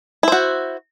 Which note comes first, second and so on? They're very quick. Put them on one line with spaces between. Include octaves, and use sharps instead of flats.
E4 C5 F#4